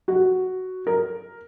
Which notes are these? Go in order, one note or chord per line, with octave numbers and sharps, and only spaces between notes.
F#4
A#4